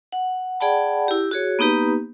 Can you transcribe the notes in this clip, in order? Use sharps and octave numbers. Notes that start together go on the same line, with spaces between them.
F#5
G#4 D5 F#5 G5 A5 B5
E4 G4
F#4 G#4 C#5
A#3 B3 D#4 G4 B4